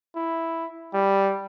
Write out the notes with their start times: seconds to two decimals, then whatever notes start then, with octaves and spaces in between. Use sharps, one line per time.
0.15 E4
0.94 G3